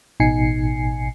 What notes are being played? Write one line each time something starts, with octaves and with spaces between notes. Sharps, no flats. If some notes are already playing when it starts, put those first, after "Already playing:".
A1 B2 D#4 G#5 C7 C#7